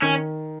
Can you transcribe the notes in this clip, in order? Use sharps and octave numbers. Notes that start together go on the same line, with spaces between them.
D#3 C#4